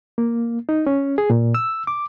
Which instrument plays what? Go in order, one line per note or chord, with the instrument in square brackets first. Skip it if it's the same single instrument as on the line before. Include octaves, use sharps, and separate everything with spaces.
[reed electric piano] A#3
D#4
C#4
G#4
A#2
E6
D6